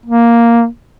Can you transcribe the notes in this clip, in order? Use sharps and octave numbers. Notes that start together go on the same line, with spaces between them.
A#3